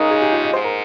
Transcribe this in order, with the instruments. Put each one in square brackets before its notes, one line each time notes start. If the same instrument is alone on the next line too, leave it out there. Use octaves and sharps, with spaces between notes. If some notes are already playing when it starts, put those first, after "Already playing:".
Already playing: [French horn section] C#3 G#3 D#4 [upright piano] A#4
[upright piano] G#4
G4
F4
D#5
[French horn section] G#2 [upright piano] C5
[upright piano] A#4